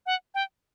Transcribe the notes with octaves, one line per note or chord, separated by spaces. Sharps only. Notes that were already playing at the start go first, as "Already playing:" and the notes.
F#5
G5